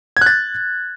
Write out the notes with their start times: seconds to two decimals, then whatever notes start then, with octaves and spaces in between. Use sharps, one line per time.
0.17 G#6
0.21 F#6
0.26 A6